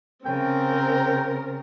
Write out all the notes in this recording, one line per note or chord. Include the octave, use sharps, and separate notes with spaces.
C#3 C4 A#4 G5